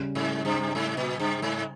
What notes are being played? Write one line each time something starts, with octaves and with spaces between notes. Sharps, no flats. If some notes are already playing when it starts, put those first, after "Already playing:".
Already playing: C#3 G3 C#4
G#2
G2
G#2
A#2
G2
G#2